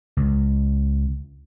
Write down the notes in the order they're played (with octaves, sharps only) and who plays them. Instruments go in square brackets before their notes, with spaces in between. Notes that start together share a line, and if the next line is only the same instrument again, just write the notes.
[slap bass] C#2